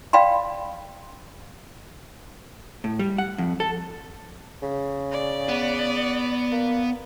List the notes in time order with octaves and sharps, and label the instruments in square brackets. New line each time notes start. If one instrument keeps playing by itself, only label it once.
[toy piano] D5 F5 G5 B5 C6
[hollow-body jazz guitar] A2
G3
F#5
F2
A4
[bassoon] C#3
[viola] D5
[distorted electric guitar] B3
[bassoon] A#3